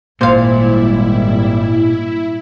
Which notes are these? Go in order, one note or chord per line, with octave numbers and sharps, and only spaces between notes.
G#1 A#2 G3 E4 C5 F5